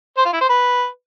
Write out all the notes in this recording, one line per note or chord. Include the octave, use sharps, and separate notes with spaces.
C5
F4
E4
C5
B4